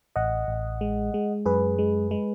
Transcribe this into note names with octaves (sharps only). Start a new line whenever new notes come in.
A1 D#5 F#5
A1
G#3
G#3
F#2 G#4 B4
G#3
G#3